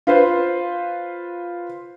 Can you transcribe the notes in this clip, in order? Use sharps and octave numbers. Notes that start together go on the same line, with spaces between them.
F4 B4 C5